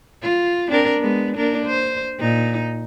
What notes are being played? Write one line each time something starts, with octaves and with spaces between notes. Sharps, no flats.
F4
C4 D4 A#4
G#3 B3
A#3 D4 A#4
C5
A#2 D#4